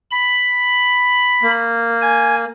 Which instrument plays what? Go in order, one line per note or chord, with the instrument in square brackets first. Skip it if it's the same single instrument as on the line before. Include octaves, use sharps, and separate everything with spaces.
[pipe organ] B5
[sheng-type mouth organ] A#3
[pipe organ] G#5